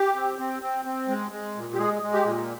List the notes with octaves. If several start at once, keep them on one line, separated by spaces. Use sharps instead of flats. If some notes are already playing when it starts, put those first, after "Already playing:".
Already playing: G4
C4
C4
C4
C4
G#3
G#3
A#2
G4
G#3 G#4
G#3
G4
A#2